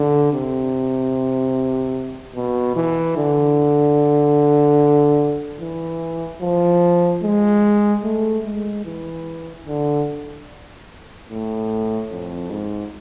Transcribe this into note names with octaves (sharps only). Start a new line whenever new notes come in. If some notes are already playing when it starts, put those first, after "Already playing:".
Already playing: D3
C3
B2
E3
D3
E3
F3
G#3
A3
G#3
E3
D3
A2
F2
G#2